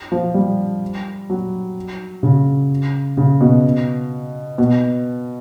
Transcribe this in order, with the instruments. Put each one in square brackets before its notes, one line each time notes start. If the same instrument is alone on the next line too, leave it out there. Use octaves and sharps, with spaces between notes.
[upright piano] F3
G3
F#3
C#3
C#3
B2
B2